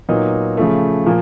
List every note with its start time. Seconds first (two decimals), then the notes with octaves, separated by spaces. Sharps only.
0.09 A#2 F#3 B3 D#4
0.57 C#3 F3 A3
1.06 A#2 F3 A#3